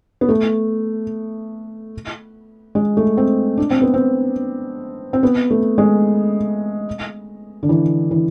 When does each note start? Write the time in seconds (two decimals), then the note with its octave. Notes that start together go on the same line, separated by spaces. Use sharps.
0.21 B3
0.29 A3
2.75 G#3
2.97 A3
3.17 C4
3.57 D4
3.71 C4
3.82 B3
3.94 C4
5.13 C4
5.23 B3
5.50 A3
5.78 G#3
7.63 D3
7.69 E3
8.11 E3